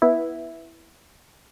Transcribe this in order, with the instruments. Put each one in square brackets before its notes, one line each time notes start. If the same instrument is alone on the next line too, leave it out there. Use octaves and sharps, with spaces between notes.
[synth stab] B3 E4